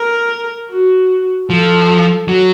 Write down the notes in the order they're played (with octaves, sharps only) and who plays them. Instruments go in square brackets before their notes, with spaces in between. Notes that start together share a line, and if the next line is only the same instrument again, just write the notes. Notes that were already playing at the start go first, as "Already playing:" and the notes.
Already playing: [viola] A#4
F#4
[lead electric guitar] F3 [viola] A4
[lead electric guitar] F#3